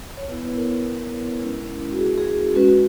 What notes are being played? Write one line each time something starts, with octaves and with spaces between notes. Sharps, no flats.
C#5
B3 E4 B4
B4
A#4
G#3 C#4 E4
F#4
G#4
G#4
G#4
G#3 C#4 F#4 B4